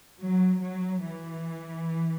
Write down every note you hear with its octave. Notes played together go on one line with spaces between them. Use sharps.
F#3
F#3
E3